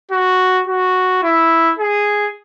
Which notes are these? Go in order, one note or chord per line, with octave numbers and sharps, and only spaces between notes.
F#4
F#4
E4
G#4